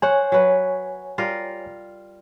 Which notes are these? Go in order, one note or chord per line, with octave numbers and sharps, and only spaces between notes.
C5 C#5 F#5 G#5
F#3 B4
G3 F4 A#4